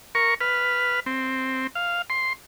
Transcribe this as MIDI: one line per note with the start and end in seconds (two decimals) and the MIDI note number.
0.15 0.34 70
0.15 0.34 85
0.41 1.00 71
0.41 1.00 89
1.06 1.67 60
1.75 2.02 77
2.10 2.33 84